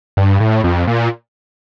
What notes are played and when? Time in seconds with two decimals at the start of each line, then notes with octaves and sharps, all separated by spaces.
0.17 G2
0.40 A2
0.64 F2
0.87 A#2